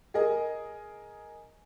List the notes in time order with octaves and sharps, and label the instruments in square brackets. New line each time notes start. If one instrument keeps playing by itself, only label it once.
[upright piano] G#4 A#4 D#5